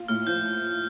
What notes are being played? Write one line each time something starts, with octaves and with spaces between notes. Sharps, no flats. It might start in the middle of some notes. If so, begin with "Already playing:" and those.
Already playing: F4
A2 F6
F3 G6